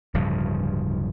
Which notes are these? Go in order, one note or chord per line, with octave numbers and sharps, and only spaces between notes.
D1 G2 C#3 F3